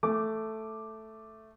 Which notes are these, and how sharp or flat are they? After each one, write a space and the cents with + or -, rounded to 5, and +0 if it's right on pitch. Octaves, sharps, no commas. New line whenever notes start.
A3 +0 D6 +0